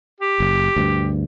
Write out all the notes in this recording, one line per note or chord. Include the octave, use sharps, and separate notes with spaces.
G4
F#1
D2 G2